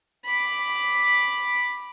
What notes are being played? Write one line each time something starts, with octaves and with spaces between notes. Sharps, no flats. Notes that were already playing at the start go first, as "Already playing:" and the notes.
B5 D6